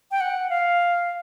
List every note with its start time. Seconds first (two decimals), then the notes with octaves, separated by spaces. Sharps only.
0.11 G5
0.21 F#5
0.50 F5